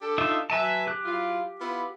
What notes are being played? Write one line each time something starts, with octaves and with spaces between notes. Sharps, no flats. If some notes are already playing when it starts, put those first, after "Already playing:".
D4 G4 A4
D#4 F4 E5
F#3 B4 E5 G#5 A5
G4 F#6
F#3 E4 F4
B3 E4 F4